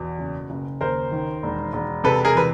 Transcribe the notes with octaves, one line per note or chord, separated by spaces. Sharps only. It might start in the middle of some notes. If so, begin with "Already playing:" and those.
Already playing: E2 B2
F#1
F#1
D#2 A#4 C5
D#3
E1
E1
C3 A4 B4
G#4 A#4
E3 B4